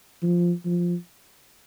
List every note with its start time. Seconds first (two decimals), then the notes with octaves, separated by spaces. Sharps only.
0.23 F3
0.65 F3